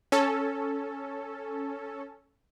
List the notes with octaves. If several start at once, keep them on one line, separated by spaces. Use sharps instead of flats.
C#4 A4